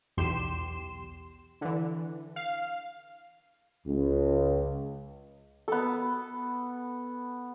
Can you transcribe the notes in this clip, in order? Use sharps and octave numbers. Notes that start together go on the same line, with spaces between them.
B1 E2 G4 C6 E7
D3 E3
F5
C#2
B3 A4